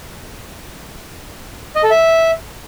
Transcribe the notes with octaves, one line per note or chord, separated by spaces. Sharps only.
D#5
A4
E5